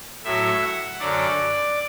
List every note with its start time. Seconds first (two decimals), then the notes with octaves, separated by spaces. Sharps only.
0.24 A2 F#3 E5
0.62 F#5
0.99 F#2 D3 F#3 D5